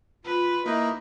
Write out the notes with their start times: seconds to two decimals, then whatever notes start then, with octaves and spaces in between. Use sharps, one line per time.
0.25 F4 B4
0.66 A#3 D#4 E4 D#5